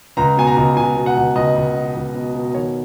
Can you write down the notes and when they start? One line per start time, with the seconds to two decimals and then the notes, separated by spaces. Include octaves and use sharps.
0.17 C#2 A#5
0.37 B2 G#5
0.47 A#5
0.57 C#2
0.76 C#2 G#5
0.96 B2
1.06 F#5
1.16 C#2
1.36 C#2 D#5
1.56 C#2
1.76 B2
1.95 C#2
2.15 B2
2.35 B2
2.54 D#3 C#5